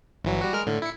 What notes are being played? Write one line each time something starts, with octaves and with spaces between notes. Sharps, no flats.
G1 E3 F#3
G3 F#4
G#3 A#4 F6
A2 D3
E4 C#7